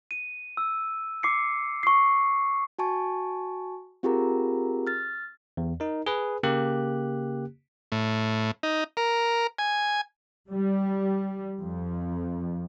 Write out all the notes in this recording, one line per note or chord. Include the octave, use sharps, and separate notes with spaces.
D#7
E6
D6 C7 C#7
C#6 C7
F#4 G#5 A5 C#6
C4 F4 G4 G#4 A#4 A#5
F6 A6
E2
D#4 A#4
G#4 B4
C#3 A#3 G4 F#6
A2
D#4
A#4
G#5
G3
F2